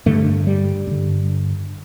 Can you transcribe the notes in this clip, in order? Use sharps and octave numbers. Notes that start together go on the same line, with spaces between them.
G2 D3 A3
G3
G2 D3